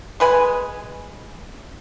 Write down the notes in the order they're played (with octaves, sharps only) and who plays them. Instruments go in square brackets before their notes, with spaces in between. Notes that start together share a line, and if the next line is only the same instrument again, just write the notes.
[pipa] G#3 B4 G#5